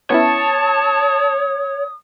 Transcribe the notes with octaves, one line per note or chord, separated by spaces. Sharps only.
B3 C#4 E4 C#5 A5 D#6